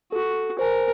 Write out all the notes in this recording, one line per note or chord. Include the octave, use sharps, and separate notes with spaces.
F#4 A4
A#4 C5 G#5